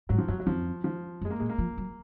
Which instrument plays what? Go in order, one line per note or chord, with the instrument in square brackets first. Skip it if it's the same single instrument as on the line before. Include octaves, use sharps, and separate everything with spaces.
[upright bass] G#2 [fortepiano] F#3
[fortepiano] F3
[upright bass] F#2 [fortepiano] F#3
[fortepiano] F#3
[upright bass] F2 [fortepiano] F3
[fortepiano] F3
[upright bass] F#2
[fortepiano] G#3
A#3
[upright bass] A#2 [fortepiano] G#3
[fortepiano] A#3
[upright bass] F3
F#3